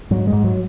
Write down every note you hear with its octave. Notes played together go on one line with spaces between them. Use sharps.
G#2 F#3
G#3
G#2
F#3